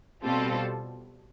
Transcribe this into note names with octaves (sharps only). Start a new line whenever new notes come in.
B2 G3 C4 F4 A4